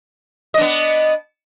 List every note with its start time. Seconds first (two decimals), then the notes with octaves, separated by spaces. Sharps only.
0.54 D#5
0.58 D4
0.61 B3